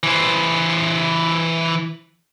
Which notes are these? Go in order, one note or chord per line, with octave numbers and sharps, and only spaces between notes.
E3 C5